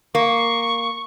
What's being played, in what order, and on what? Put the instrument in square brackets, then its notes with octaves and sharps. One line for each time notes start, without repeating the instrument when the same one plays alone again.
[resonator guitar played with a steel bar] A#3 [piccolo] C#6